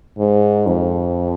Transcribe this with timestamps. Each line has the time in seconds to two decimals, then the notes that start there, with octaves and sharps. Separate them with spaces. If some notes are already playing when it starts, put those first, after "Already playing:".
0.18 G#2
0.67 F2